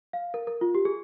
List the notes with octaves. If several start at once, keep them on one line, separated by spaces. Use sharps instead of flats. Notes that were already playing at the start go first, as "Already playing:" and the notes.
F5
A#4
A#4
F4
G4
G#4